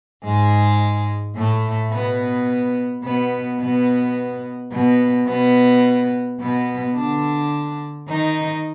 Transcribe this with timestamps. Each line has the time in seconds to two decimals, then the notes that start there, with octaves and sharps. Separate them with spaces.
0.24 G#2 G#3
1.36 A2 A3
1.92 B2 B3
3.03 B2 B3
3.60 B2 B3
4.71 B2 B3
5.28 B2 B3
6.40 B2 B3
6.95 D3 D4
8.07 D#3 D#4